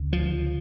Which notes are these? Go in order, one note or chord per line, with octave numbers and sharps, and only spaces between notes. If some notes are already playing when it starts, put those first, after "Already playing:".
Already playing: D2 C#3
F3